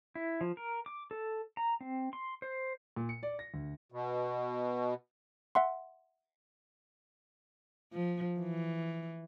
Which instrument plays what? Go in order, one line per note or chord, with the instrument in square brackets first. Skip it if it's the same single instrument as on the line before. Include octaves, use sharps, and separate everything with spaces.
[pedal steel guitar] E4
F3
A#4
D6
A4
A#5
C4
C6
C5
[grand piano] A#2
C#7
D5
A#6
D2
[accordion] B2
[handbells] E5 F#5 C6
[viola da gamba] F3
E3